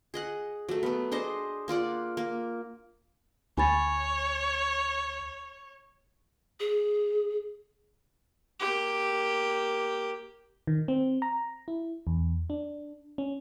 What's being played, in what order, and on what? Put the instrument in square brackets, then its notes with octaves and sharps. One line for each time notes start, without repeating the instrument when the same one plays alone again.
[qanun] G#4 D#5 F#5
F#3 A3
A3 B3
D4 G#4 C5 D#5
A#3 F4 D5 F#5
A#3
[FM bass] D2 [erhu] C#5 [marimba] G#5 B5 A6
[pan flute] G#4
[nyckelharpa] A#3 G4
[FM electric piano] D#3
C4
A#5
E4
E2
D4
C#4